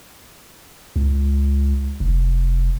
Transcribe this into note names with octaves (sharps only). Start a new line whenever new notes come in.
C#2
F1